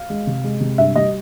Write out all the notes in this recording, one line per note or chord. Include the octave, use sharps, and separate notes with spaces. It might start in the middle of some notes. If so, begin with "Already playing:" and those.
Already playing: F5
G#3
C3
G#3
C3
G2 E5
G3 D#5